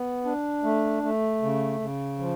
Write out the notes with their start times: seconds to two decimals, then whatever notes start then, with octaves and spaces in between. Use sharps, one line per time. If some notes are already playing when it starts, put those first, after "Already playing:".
Already playing: B3
0.25 D4
0.64 A3
1.03 A3
1.42 C#3
1.80 C#3
2.19 F3